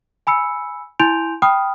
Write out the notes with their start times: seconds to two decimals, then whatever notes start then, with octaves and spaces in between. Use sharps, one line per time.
0.27 G#5 B5 E6 C#7
1.00 E4 G#5 C6 G6 D7 F7
1.42 G5 B5 D#6 F6